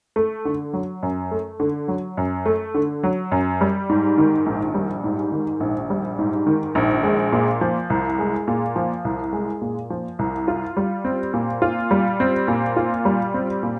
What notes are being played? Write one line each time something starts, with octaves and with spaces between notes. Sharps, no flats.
A3
D3
F#3
F#2
A3
D3
F#3
F#2
A3
D3
F#3
F#2
G3
G#2
D#3
A#1
G3
G#2
D#3
A#1
G3
G#2
D#3
A#1
G#3
A#2
F3
C2
G#3
A#2
F3
C2
G#3
A#2
F3
C2
F4
G3
C4
A#2
F4
G3
C4
A#2
F4
G3
C4
A#2